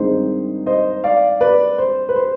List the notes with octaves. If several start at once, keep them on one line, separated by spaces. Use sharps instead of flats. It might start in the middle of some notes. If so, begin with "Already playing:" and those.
Already playing: G2 D#3 G#3 C4 D#4 C5
C5 D#5
D5 F5
B4 D5
C5
B4
C5